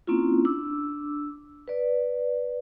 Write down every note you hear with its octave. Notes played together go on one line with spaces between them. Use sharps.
A#3 C4 C#4 E4 F4
D4 D6 E6
B4 D5